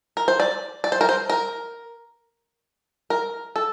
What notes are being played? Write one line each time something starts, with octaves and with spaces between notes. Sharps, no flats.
A#4
C5
D5
D5
C5
A#4
C5
A#4
A#4
A4